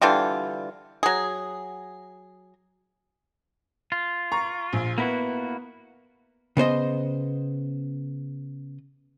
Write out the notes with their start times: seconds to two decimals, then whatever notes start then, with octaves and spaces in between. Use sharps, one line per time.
0.02 D3 E3 G3 F4
1.03 F#3 G#4
3.92 F4
4.32 A#5 C#6
4.73 A#1
4.98 A#3 B3 E4 F#4
6.57 C#3 B3 C5 D#5